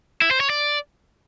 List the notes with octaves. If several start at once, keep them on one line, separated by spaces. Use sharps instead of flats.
E4
C5
C#5
D5